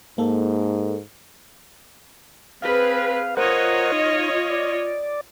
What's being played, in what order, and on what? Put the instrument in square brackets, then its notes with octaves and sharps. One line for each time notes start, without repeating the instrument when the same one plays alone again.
[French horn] G#2 [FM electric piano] A#3 A4
[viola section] C4 G#4 B4 [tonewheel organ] F5
[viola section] F4 C#5 D#5 [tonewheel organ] A#4 C5 F#5
[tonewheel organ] D#4
D5